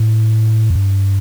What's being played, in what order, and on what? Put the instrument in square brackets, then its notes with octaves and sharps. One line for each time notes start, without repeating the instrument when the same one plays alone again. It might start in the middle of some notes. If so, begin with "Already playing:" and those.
Already playing: [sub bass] A2
F2
G2